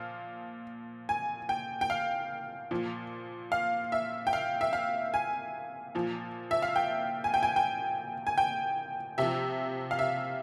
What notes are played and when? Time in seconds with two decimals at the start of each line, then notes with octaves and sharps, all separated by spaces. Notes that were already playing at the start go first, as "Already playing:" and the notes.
Already playing: A#2 F3 F5
1.09 G#5
1.49 G5
1.81 G5
1.90 F5
2.71 A#2 F3
3.52 F5
3.92 E5
4.27 G5
4.33 F5
4.61 E5
4.73 F5
5.14 G#5
5.95 A#2 F3
6.51 E5
6.62 F5
6.76 G5
7.24 G#5
7.34 G5
7.43 G#5
7.56 G5
8.27 G#5
8.38 G5
9.18 C3 F3 E5
9.91 F5
9.99 E5